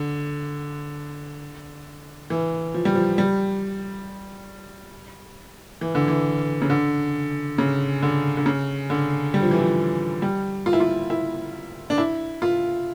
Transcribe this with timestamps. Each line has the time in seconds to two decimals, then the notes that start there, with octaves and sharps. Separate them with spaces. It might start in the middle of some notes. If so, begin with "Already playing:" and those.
Already playing: D3
2.30 E3
2.74 F3
2.85 G3
2.95 F3
3.18 G3
5.81 E3
5.95 D3
6.08 E3
6.62 C#3
6.70 D3
7.58 C#3
8.02 D3
8.37 D3
8.46 C#3
8.90 D3
9.34 G3
9.42 F3
9.51 E3
9.58 F3
10.22 G3
10.66 F4
10.73 E4
10.80 F4
11.10 E4
11.90 D4
11.98 E4
12.42 F4